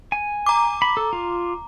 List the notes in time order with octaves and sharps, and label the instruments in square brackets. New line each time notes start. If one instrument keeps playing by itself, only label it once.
[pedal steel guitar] G#5
[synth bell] A#5 D6
[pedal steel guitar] B5
A4
F4